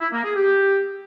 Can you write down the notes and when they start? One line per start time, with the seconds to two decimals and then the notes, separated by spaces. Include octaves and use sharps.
0.01 E4
0.12 A#3
0.24 G#4
0.36 G4